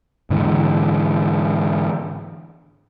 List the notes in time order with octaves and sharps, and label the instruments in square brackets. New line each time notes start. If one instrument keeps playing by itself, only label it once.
[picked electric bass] G#2 D3 E3